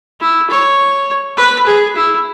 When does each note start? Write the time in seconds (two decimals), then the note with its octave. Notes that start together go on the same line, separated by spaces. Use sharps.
0.20 E4
0.50 C#5
1.37 B4
1.67 G#4
1.95 E4